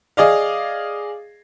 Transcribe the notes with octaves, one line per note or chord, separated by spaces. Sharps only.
G#4 D5 D#5 F5